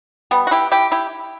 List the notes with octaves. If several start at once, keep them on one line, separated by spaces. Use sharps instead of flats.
G3 B3
F#4
E4 G4
E4 G4
E4 G4